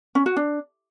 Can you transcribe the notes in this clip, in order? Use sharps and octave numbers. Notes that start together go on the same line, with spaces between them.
C#4
F#4
D4